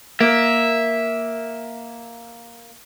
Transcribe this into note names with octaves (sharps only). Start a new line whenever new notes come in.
A#3 E5